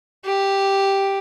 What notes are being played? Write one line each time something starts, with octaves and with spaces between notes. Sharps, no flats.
G4